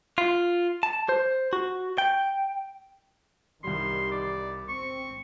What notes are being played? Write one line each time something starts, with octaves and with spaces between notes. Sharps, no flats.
F4
A5
C5
F#4
G5
C2 D#3 G3 C6
D5
C4 C#6